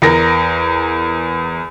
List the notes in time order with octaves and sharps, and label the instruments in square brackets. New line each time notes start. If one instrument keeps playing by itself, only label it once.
[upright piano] E2 A#4 A#6